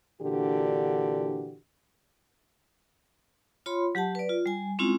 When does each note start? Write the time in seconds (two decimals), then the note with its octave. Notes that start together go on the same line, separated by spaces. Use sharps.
0.22 A#2 D3 E3 D4 F#4 G4
3.66 F4 C#5 B5 C6
3.95 F#3 G4 F#5 A5
4.15 B4 D5
4.29 F4
4.46 G3 G#5
4.79 G#3 C4 C#4 E4 F4